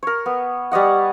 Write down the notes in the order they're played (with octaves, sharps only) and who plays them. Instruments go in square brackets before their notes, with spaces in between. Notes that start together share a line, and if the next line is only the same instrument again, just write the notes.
[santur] A#4 C#5
B3
G3 C#5 D#5 F#5